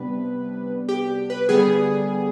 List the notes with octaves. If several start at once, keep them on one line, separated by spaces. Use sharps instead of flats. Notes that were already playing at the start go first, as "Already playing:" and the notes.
Already playing: C3 G3 B3 D4 B4
G4
B4
D3 G3 B3 G#4